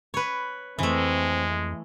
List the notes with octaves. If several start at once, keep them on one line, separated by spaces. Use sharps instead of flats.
B4 C#5
F2 E3 G#3 A3 C4